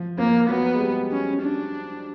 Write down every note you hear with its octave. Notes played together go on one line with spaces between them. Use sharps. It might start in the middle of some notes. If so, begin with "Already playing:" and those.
Already playing: F3
F3 A#3
F#3 B3
G#3
G3
C#4
D4